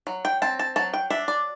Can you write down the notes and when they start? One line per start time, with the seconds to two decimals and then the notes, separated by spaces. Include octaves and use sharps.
0.07 F#3
0.25 G5
0.42 C4 A5
0.59 A5
0.76 F#3 A5
0.94 G5
1.10 D4 E5
1.28 D5